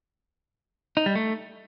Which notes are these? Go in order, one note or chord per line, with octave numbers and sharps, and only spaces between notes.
D#4
G3
A3